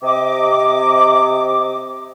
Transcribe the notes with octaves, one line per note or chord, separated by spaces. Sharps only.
C3 D#5 D6